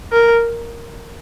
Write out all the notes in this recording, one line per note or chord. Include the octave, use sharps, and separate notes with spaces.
A#4